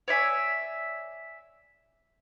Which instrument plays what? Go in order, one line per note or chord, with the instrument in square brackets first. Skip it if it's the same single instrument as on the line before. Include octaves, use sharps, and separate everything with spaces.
[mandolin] C#5 D5 E5 G#5